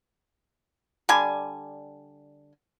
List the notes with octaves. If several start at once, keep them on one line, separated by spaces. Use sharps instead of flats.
D3 G3 G#5